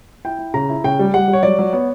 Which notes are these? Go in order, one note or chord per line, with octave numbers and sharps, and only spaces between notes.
E4 G5
E4
C#3 A#5
E4
C#3 G5
G3
G3 F#5
G3
C#5
F#3 D5
F#3
B3 C#5